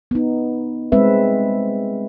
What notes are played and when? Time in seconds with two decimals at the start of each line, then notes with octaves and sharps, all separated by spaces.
0.11 B3 D#4
0.92 G3 G#3 C4 B4 E5